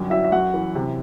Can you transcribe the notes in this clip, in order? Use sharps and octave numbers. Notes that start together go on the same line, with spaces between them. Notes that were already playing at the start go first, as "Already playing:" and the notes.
Already playing: G1 F#2
F#3 E4 E5
E5
F#2 F#4 F#5
E3
C3